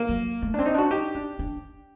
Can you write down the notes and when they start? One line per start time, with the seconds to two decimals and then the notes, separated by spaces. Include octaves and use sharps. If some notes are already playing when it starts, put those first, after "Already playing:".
Already playing: A#3
0.09 F#3
0.42 A3
0.54 C4 D4
0.66 D#4
0.74 D4 F#4
0.91 D#4 G4
1.15 D4
1.39 D4